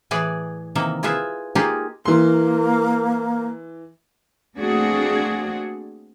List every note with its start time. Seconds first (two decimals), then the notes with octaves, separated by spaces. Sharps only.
0.11 A2 E3 G#4 B4 D5
0.75 C3 D#3 E3 A#3 E5
1.03 E4 F4 G#4 B4 E5
1.55 A#3 D#4 F4 G4 G#4
2.05 E3 A#3 C6
4.57 A3 A#3 C4 D4 F#4 G#4